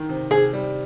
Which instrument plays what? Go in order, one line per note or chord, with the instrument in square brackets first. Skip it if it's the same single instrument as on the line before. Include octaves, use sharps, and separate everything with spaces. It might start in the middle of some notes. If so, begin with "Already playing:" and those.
Already playing: [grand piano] D#3
C3
[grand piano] C3 [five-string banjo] G#4
[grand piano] G3